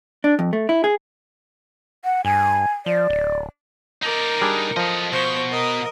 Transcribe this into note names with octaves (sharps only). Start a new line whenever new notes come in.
D4
F2
A3
E4
G#4
F#5
G2 G#5
F3 D5
D1
D#4 A#4 D5
G3 D4 G#4
F3 A4 D#5
B2 C5 C#6
A#4 D#5